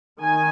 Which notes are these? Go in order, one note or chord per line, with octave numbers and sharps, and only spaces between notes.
D#3 G#5